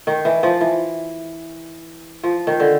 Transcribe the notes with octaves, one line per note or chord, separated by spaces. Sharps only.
D#3
E3
F3
E3
F3
D#3
D3